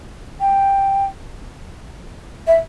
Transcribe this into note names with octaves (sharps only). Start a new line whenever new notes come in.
G5
E5